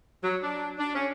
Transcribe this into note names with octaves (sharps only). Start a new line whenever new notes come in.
F#3
D4
D4
C#4